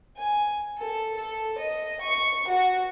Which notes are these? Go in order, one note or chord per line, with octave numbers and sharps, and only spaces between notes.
G#5
A4
A4
D#5
C#6
F#4